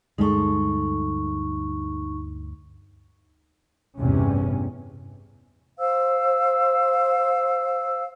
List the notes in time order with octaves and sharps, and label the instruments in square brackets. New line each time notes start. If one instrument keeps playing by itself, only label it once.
[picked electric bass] D2 G2 G3 [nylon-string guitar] G#3 A4 [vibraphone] D#4 C#6
[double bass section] A1 E2 G2 C3 C#4
[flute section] C5 F5 E6